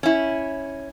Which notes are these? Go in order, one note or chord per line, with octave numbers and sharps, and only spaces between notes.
C#4 E4